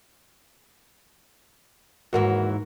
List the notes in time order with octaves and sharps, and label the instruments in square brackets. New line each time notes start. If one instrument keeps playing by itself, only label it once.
[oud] D#2 G#2 E3 [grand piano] F#4 A#4 F#5